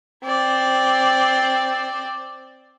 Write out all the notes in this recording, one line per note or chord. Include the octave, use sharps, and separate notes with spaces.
C4 D5